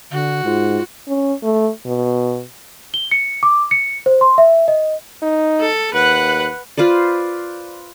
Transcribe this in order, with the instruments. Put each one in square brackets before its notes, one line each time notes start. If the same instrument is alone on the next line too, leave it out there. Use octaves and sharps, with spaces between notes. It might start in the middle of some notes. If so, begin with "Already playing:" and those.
[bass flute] D3 [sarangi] F#4
[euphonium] G#2 [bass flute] F4
[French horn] C#4
A3
B2
[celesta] G7
C#7
D6
C#7
C5
C6
E5
D#5
[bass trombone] D#4
[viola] A4
[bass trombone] D#2 [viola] B4 F#5
[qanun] F4 B4 C5 D5